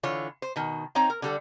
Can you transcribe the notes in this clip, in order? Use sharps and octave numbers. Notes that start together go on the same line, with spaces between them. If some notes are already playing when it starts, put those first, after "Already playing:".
D3 E3 F4 C#5
C5
B2 D#3
C4 D#4 C#5 A#5
A#4
D3 G3 A4